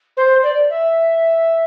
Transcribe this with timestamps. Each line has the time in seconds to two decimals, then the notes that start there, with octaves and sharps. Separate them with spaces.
0.17 C5
0.42 D5
0.69 E5